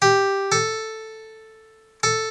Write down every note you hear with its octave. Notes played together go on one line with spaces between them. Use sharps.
G4
A4
A4